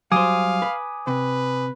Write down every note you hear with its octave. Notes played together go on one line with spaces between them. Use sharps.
F#3 G3 C5 F5 G#5 D6 D#6
B4
C3 B4